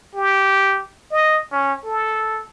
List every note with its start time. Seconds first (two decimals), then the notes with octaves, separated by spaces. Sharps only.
0.15 G4
1.12 D#5
1.52 C#4
1.85 A4